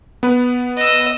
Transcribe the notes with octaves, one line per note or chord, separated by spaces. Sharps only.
B3 B4
D#5 E6